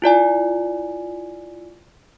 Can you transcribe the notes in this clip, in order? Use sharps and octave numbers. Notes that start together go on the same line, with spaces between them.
E4 F4 D5 G#5